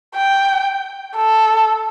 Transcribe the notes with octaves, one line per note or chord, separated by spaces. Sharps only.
G5
A4